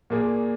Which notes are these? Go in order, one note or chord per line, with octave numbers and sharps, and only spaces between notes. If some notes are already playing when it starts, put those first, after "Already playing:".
A#2 A#3 G#4